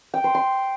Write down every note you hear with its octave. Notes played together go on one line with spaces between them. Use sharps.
G5
C5
C6